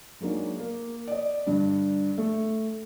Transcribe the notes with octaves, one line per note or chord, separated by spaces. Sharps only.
F#3 G#3 A#3 D4 D#4
A#3
D5 D#5
G2 D3 D4
A3